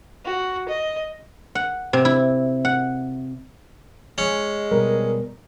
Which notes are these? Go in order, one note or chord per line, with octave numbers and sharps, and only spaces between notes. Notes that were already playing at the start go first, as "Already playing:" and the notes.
F#4
D#5
F#5
C3
E4
F#5
G#3 C#4
B2 G3 A#4